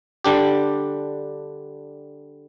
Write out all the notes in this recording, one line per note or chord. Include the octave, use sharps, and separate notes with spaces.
D3 G3 D4 G4